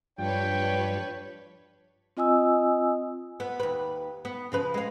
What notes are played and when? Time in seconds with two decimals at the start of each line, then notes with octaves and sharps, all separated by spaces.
0.18 G2 F3 D4 B4 C#5 G5
2.17 C4 F4 D#5 G#5 D#6 E6
3.40 B3
3.60 D#2 B4
4.25 B3
4.52 C#3 F3 B4
4.74 G#3 F5